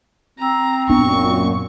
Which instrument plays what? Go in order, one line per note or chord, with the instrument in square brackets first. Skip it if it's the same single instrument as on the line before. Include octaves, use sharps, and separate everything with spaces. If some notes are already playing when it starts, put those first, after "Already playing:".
[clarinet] C4 [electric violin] A#5
[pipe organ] F#2 A#2 [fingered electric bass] B3 D4 [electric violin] C#6